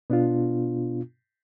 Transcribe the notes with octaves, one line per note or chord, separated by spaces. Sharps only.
B2 B3 D4 F4